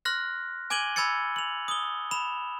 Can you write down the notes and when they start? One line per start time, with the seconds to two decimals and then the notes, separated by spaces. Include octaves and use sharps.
0.05 C6 F6 F#6 A#6
0.70 G#5 D6 G#6 D#7 F#7 G7
0.96 B5 E6 G#6 A6 C#7
1.36 F7 F#7
1.68 D#6 G7
2.11 B5 E7 F7